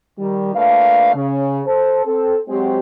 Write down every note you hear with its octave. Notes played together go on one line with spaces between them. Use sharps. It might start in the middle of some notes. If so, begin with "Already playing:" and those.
D#3 G3
A#2 A3 D4 A#4 B4 F5
C#3
A4 C5
C4 A4
F#3 G#3 C4 G4